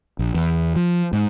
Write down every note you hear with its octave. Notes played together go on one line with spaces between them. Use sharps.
A#1
E2
F3
G#2